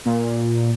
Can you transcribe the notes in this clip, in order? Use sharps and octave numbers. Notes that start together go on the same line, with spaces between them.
A#2